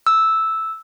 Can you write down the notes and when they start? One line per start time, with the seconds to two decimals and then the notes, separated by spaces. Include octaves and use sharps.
0.07 E6